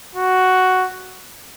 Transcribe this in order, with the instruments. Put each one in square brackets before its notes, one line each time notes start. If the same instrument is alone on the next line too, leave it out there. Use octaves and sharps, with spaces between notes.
[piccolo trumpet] F#4